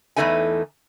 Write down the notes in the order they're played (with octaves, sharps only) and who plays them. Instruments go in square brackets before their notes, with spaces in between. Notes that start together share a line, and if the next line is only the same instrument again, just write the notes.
[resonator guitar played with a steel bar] E2 G2 E3 A3 D#4 G#5